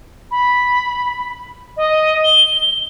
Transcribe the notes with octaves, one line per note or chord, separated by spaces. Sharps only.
B5
D#5
G7